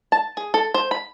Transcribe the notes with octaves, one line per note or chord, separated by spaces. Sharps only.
A5
G#4
A4
C5
B5